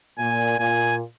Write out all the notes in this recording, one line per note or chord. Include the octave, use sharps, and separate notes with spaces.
A#2 G#5
A#2 G#5